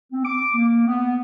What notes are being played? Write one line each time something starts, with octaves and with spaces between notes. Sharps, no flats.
C4
D6
A#3
B3